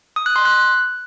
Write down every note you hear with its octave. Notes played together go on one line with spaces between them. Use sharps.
D#6
F#6
C6
F#6